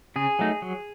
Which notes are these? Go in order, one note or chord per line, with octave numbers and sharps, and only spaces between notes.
C#3 G#4
F#3 A3 D#4
F#3